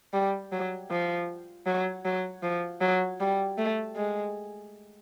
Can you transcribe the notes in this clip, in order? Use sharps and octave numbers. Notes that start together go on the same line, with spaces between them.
G3
F#3
F3
F#3
F#3
F3
F#3
G3
A3
G#3